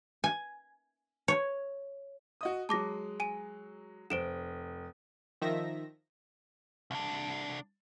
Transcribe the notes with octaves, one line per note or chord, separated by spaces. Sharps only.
G#5
C#5
F#4 D#5 D#6
F#3 G#3 A5 D6 A#6
G#5 D#7
F1 C5 D7 E7
D#3 F3 E5 A#6
C2 D4